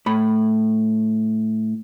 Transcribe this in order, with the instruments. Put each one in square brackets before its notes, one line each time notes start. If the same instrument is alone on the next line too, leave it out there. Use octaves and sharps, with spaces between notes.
[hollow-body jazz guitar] A2 B5